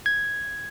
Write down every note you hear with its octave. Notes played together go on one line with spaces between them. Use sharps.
G#6